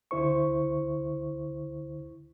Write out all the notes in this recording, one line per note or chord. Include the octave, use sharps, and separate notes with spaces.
C#2 D3 E4 C5 C#6